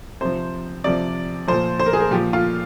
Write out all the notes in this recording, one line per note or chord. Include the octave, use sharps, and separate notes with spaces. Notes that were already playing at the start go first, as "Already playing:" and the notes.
C3 F3 C5
C3 F3 D5
A#2 F3 C5
C5
A#4
G#4
A#4
A#2 F3 G4
F4